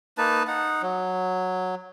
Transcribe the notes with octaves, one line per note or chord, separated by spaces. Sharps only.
A#3 D#4 B4 A5
D#4 F#5
F#3